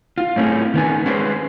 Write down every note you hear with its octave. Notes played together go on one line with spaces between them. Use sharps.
F4
A2 A3 C4 C#4 G#4
D#3 B3 G#5
G#3 C#4 G#4 B4 C5